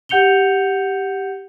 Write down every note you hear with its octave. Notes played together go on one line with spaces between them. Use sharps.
G4 F#5 G6 C#7 F7 G7